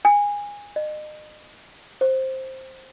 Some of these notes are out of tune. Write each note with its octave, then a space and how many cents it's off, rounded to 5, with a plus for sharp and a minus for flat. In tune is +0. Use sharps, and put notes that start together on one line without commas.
G#5 -20
D#5 -35
C5 +10